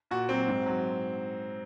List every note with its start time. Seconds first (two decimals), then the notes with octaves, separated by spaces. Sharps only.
0.11 A#2 F#4
0.29 F#3 C4
0.48 G#2
0.66 F#3